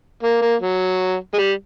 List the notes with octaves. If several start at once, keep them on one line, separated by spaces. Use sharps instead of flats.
A#3
A#3
F#3
G#3
G3